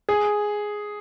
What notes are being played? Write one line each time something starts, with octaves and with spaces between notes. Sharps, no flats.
G#4